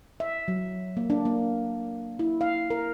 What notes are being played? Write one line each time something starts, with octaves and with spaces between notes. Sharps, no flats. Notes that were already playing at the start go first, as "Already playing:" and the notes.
E5
F#3
A#3
D4
A#3
E4
F5
A#4